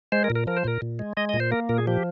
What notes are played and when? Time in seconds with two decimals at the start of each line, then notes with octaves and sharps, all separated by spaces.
0.12 G#3 C5
0.24 A#4
0.30 A#2
0.35 A#4
0.47 F3 A#4
0.57 C5
0.64 A#2 A#4
0.82 A#2
0.99 G#3
1.17 G#3 D#5
1.29 A#2 D#5
1.40 C5
1.52 A#3 A#4
1.69 A#2 A#4
1.78 G#4
1.87 F3 G4